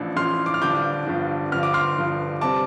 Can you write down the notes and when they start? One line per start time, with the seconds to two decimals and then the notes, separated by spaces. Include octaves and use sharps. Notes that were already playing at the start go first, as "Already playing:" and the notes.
Already playing: A1 A2 F3 D4
0.16 A1 A2 F3 D4 C6 F6
0.46 D6
0.54 F6
0.62 G1 G2 F3 D4 D6 G6
1.07 G1 G2 F3 D4
1.52 G1 G2 F3 F6
1.63 D6
1.74 C6 F6
1.97 G1 G2 F3
2.41 C3 G3 C4 A5 D6